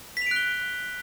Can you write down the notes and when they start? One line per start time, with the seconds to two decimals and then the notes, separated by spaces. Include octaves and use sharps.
0.17 B6
0.22 F7
0.26 D7
0.31 F#6
0.36 G7